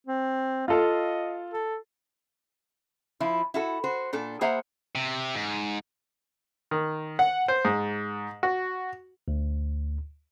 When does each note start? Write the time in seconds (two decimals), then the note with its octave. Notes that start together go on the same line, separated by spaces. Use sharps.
0.07 C4
0.68 F4 A4 D#5 F5
1.52 A4
3.20 F3 E4 F4
3.54 E4 F#4 A4
3.84 F#4 C5
4.13 A#2 D4 A4
4.41 A#3 G#4 C5 E5 F#5 A#5
4.95 C3
5.35 G#2
6.71 D#3
7.19 F#5
7.48 C5
7.65 G#2
8.43 F#4
9.28 D2